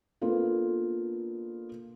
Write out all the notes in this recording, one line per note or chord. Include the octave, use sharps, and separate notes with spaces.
A#3 B3 D4 F4 A4